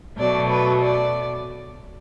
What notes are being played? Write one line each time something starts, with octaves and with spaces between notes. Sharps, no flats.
B2 F#3 A3 D5
B4
D5